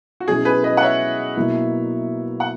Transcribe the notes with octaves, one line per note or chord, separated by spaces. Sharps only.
F#4
B2 F#3 C#4 E4 G#4
G#4 B4
B4 D#5
F#5
C#5 E5
B2 F#3 A#3 E4
F#5